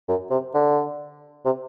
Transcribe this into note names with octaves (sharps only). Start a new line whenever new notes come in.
F#2
C3
D3
C3